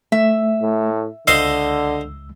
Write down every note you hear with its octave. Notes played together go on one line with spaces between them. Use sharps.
A3 E5
A2
C#2 D3 C5 D#5 F5 E6